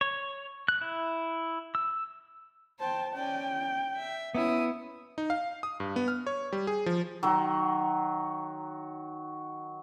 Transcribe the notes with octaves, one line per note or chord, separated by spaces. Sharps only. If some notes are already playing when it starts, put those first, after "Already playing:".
C#5
F#6
E4
E6
C5 G5 A5
C#4 D5 G5
E5
B3 C#4 E4 D#6
D#4
F5
D#6
G2
B3
F6
C#5
G3
G#4
F3
D#3 F#3